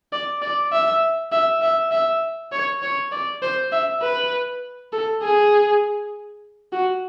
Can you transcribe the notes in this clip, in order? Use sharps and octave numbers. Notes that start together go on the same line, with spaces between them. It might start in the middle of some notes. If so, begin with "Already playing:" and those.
D5
D5
E5
E5
E5
E5
C#5
C#5
D5
C5
E5
B4
A4
G#4
F#4